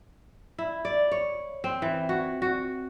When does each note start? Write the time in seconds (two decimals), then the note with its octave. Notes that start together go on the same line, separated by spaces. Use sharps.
0.58 E4
0.85 D5
1.11 C#5
1.64 C4
1.82 E3
2.09 F#4
2.42 F#4